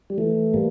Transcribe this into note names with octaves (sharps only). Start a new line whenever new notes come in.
G3
E3 A3
A2 G3 A#3